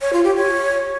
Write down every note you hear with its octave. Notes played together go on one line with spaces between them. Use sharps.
C#5
F4
G4
C#5